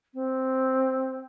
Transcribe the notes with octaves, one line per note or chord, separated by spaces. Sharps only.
C4